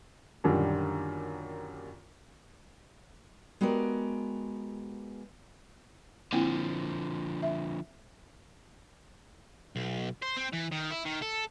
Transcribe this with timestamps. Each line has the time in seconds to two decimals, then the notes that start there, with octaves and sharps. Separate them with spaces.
0.44 F#2 A#2 D3 D#3 G3
3.61 G#3 B3 F#4 G4 A#4 D5
6.33 D3 F3 A#3 C4 E4
7.43 E5
9.76 B1
10.22 C5
10.37 C4
10.53 E3
10.72 D#3
10.91 E4
11.06 D#3
11.22 A4